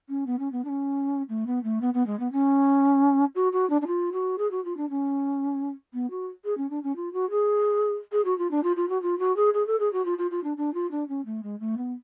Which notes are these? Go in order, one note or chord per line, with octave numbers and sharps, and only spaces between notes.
C#4
B3
C#4
B3
D4
C#4
A3
B3
A3
B3
B3
G#3
B3
C#4
F#4
F#4
D4
D4
F4
F#4
G#4
F#4
F4
D4
C#4
B3
F#4
G#4
C#4
D4
C#4
F4
F#4
G#4
G#4
F#4
F4
D4
F4
F4
F#4
F4
F#4
G#4
G#4
A4
G#4
F#4
F4
F4
F4
D4
D4
F4
D4
C#4
A3
G#3
A3
B3